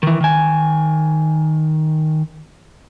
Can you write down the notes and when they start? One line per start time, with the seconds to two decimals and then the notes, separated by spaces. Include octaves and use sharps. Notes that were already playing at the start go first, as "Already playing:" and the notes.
0.03 D#3 E3
0.21 D#3 G#5